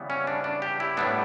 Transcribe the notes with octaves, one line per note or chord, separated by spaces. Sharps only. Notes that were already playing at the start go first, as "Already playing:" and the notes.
Already playing: C#3 E3 G3 B3
C#4
D4
D4
G4
E4
A2 G3 B3 D4